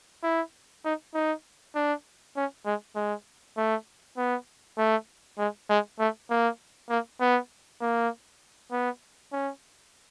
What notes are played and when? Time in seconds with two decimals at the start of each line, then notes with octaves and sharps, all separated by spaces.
0.23 E4
0.85 D#4
1.14 D#4
1.75 D4
2.36 C#4
2.65 G#3
2.96 G#3
3.57 A3
4.17 B3
4.78 A3
5.39 G#3
5.70 G#3
5.99 A3
6.30 A#3
6.90 A#3
7.20 B3
7.81 A#3
8.72 B3
9.33 C#4